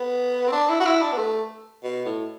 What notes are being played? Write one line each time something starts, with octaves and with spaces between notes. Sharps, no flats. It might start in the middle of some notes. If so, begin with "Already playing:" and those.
Already playing: B3
C4
D4
E4
F#4
E4
D4
B3
A3
B2
A2